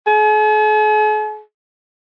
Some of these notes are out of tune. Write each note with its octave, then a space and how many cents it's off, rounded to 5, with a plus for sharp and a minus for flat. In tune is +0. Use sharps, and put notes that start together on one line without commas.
G#4 +45